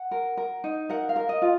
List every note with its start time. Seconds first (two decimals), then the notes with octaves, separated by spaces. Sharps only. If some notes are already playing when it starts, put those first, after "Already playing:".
Already playing: F#5
0.11 A#4
0.37 A#4
0.64 D#4
0.89 A#4 F#5
1.09 F5
1.16 A#4
1.29 D#5
1.42 F4